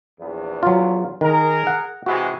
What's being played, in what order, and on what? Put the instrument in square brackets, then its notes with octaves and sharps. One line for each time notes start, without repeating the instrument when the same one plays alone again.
[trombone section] A#1 E2
[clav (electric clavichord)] F#3 F4
[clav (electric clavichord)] D#3 [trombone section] G#4 A#4
[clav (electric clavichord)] F#5
[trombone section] C3 E3 G#3 [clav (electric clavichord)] F#4